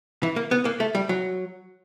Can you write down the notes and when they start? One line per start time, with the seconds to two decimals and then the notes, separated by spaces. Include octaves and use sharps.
0.23 E3
0.36 A#3
0.51 B3
0.65 A#3
0.80 A3
0.95 G3
1.09 F#3